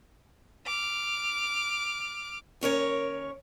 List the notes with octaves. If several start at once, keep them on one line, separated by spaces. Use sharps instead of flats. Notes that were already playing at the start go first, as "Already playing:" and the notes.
D6 F6
D#2 C#4 A#4 C#5